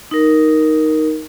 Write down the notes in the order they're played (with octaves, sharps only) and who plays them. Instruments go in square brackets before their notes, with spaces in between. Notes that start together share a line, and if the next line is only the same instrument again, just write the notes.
[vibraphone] D#4 A#4